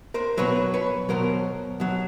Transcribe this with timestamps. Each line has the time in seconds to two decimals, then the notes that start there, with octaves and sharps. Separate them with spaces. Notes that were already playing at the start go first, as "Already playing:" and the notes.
0.14 A#4 C5
0.37 B2 F#3 B4 C#5
0.74 B4 C#5
1.09 B2 F#3 A#4 C5
1.80 B2 F#3